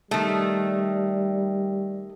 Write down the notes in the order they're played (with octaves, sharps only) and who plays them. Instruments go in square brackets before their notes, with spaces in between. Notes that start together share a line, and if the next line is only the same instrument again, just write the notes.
[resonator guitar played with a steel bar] D#3 A3 [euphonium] G3